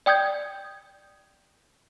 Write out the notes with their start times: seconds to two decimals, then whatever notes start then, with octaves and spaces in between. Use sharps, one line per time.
0.06 D5 G5 D#6 G6 G#6